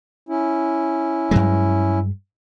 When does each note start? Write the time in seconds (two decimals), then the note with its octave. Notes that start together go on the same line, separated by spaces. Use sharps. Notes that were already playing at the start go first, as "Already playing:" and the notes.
0.29 C#4 E4
1.31 G2 F#3 G#3